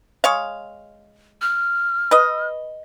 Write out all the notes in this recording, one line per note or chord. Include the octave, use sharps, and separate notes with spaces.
G#3 C#5 F5
F6
B4 D#5